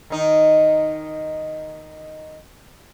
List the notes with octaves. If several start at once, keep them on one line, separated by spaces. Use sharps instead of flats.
D#3 D#4